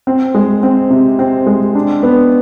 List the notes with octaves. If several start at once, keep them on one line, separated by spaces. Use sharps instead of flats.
C4
G#3
C4
C3
C4
G#3
D4
B3